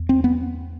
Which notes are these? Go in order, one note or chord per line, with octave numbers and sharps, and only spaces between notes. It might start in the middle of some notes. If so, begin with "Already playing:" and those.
Already playing: E2
C4
B3